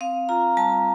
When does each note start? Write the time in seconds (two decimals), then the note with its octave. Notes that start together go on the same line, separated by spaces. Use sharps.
0.01 C4 F5
0.29 F4 A#5
0.57 G3 A5